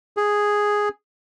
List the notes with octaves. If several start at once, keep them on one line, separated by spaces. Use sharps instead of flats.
G#4